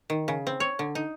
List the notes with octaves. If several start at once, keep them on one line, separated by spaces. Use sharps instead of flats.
D#3
C#3
C4
C#5
D3
D#4